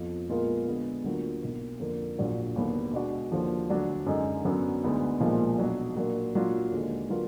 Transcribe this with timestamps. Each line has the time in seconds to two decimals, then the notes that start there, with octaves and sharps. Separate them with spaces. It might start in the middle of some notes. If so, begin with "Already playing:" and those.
Already playing: F2 F3 B3 F4
0.28 A#2 G#3 B3 F4 A#4
0.66 D3 G#3 B3 D4
1.04 D2 D3 F#3 A#3 F4
1.41 B1 B2 A#3
1.80 F2 D3 F3 A#3
2.18 A#1 A#2 F#3 D4 F4
2.56 D#2 D3 F#3 B3
2.93 B2 G#3 D4 F#4
3.32 D#2 D3 F3
3.70 D2 D3 F#3 D4
4.06 F#2 D3 G#3 D#4 G#4
4.45 F#2 D3 F#3 B3
4.83 D2 D3 G#3 B3 D#4
5.20 B1 A#2 F3 G#3
5.58 B2 F#3 D4
5.96 A#2 F#3 A#3 D4
6.34 A#2 F#3 D4 F4
6.72 D#2 D3 G#3
7.10 D3 F#3 A#3 F4 B4